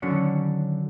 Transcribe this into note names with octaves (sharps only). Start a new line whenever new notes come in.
D3 D#3 F#3 C#4 D4